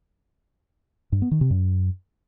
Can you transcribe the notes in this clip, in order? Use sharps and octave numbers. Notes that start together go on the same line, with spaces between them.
G2
B3
D#3
C3
F#2